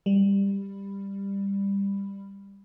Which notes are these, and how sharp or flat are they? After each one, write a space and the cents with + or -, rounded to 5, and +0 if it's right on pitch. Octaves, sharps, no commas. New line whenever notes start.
G3 +15